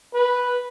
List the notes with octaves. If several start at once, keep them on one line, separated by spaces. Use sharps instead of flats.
B4